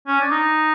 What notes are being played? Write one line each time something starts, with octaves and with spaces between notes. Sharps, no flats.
C#4
D4
D#4